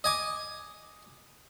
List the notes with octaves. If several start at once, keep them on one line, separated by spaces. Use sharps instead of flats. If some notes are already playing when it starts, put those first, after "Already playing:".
D#5 G#5 D6